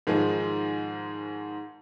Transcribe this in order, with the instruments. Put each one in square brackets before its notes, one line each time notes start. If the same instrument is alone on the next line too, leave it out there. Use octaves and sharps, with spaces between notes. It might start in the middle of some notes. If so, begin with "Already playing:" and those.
[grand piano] G#2 D#3 F3 G#3